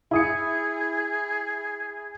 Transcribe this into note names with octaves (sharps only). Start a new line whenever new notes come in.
E4 G#4 D#6 C#7